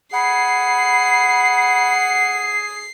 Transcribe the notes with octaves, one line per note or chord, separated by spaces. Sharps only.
G#4 F#5 B5 C7